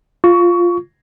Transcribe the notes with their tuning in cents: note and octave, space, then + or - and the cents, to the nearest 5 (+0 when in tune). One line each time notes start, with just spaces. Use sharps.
F4 +0 C#6 +20